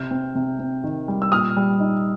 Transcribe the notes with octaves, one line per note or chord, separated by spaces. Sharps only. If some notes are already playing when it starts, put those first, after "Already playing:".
Already playing: C3 F6 G6
C4
C3
C4
D#3
G3
E6
A#2 D#6 F6
G3
D#4